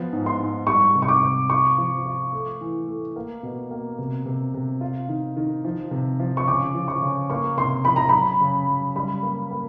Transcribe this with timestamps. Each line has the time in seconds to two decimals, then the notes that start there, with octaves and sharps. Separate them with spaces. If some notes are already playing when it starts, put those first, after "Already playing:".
Already playing: F3 B3
0.13 G#2
0.26 C6
0.39 G#2
0.67 G3 C#6
0.95 C3
1.02 C#6
1.08 D6
1.23 C3
1.50 F4 C#6
1.78 F3
2.05 F4
2.33 A3
2.61 E3
2.88 A3
3.16 A#3
3.43 B2
3.71 A#3
3.99 C3
4.26 C3
4.54 C3
4.81 F4
5.09 D#3
5.37 D#3
5.65 F3
5.91 C3
6.20 F3
6.37 C#6
6.47 C#3 D6
6.74 F3
6.88 C#6
7.02 C#3
7.30 A#3 C#6
7.57 C3 C6
7.85 F3 B5
7.96 A#5
8.09 F#2 B5
8.41 C#3
8.68 F#2
8.96 G3 B5
9.23 A#3
9.51 A#3